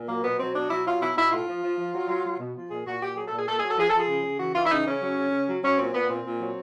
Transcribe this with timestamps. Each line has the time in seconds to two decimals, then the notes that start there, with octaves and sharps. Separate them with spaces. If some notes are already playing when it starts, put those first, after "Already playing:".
Already playing: A#2
0.08 F#3 A#3
0.24 B2 B3
0.39 F#3 C4
0.54 B2 D4
0.70 F#3 E4
0.86 F#3 F4
1.01 B2 E4
1.16 B2 E4
1.31 A2 F4
1.47 F3
1.63 F3
1.78 F3
1.93 F#3
2.08 F#3
2.24 F#3
2.39 B2
2.56 F3
2.70 A#2 G#4
2.86 A#2 F#4
3.00 A#2 G4
3.17 F#3 G#4
3.27 A4
3.32 A#2
3.37 G#4
3.47 A#2 A4
3.58 G#4
3.63 F#3
3.69 A4
3.78 F3 G#4
3.88 A4
3.94 F3
3.99 G#4
4.09 C#3
4.24 C#3
4.39 E3 F#4
4.55 E3 F4
4.65 E4
4.70 C#3 D#4
4.86 C#3 C#4
5.01 F#3
5.17 C#3
5.31 C#3
5.47 F#3
5.63 F#3 C#4
5.77 A#2 C4
5.93 A#2 B3
6.09 A#2 C4
6.25 A#2
6.39 F#3